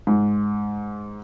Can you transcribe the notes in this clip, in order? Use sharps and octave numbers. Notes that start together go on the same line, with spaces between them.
G#2